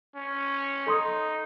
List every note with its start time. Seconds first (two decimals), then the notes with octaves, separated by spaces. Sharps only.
0.15 C#4
0.87 D#4 A4 C6 D#6